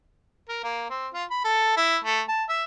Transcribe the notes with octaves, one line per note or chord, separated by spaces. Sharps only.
A#4
A#3
C4
F4
B5
A4
E4
A3
A5
E5